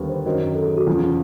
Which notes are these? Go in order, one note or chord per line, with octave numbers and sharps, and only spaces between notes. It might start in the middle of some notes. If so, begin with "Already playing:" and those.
Already playing: D#2 D3 G3 B3
C5
F#2 D#3 F#3
A4
G#4
F#4
E2 C#3 F3 F4